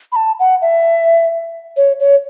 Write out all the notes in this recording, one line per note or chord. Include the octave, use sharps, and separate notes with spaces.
B5
A5
F#5
E5
C#5
C#5